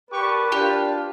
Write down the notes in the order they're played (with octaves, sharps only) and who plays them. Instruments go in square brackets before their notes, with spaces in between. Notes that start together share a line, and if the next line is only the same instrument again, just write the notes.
[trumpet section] G4 C#6 [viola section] A#4 D5 A5 [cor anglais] B4
[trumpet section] D4 F4 [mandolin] G4